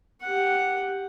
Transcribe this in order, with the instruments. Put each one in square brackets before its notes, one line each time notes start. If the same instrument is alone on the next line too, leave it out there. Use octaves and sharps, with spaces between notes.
[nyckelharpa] G4 F#5